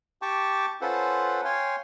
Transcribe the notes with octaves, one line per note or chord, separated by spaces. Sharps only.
G4 G5 A5 C#6 D6
C#4 F4 A4 B4 C5 F#5
C#5 F5 G5 G#5 C6